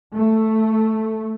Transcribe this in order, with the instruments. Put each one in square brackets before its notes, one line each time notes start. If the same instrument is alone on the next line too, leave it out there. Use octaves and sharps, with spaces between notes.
[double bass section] A3